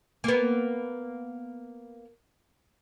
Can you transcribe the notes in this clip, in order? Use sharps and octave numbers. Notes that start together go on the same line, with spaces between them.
A#3 B3